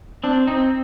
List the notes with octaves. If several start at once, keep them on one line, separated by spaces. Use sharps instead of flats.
C4 D4
C4 D#4